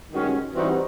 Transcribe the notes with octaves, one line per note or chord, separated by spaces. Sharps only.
G2 D#3 G#3 C#4 F#4
E3 G3 C4 D#4 F#4